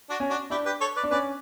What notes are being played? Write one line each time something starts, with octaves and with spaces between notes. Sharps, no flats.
D4 F#4
C#4
D4 F#4
D4 E4 G4
G4 B4
A4 C#5
B4 D5
D4
C#4 B4 D5